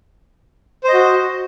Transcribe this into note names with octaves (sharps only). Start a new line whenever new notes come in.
F#4 C5 D#5